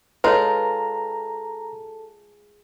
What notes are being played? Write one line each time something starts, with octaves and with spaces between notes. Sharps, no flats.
G#3 F4 A4 B4 C#5 A5 A#5